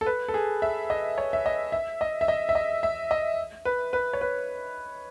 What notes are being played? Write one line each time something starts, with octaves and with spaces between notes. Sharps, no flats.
A4
B4
A4
G#4
E5
D#5
C#5
E5
D#5
E5
D#5
E5
D#5
E5
D#5
E5
D#5
B4
B4
C#5
B4